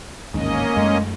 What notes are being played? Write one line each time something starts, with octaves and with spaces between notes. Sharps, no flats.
A1 D#2 G#2 A#3 C#4 D#5
F#2 G#3 A3